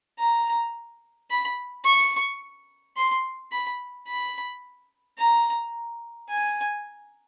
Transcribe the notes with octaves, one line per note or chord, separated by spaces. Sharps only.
A#5
B5
C#6
C6
B5
B5
A#5
G#5